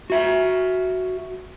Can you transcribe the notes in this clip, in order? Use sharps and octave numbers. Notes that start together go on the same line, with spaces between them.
F#4 E5